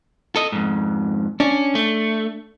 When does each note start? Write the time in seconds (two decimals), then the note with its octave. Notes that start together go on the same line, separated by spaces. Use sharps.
0.36 A4 D#5
0.52 F2 G#2
1.40 C#4 D4
1.75 A3